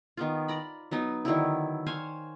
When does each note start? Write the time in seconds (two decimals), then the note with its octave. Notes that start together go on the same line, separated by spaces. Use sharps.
0.17 D#3 B3 F4
0.48 D5 A#5 B5
0.91 F#3 B3 D#4
1.25 D3 D#3 F#3 E4
1.86 C5 C#5 F5 G#5